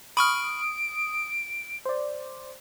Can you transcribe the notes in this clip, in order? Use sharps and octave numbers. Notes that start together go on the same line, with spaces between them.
B5 C#6 D#6 F6 D7
C5 D5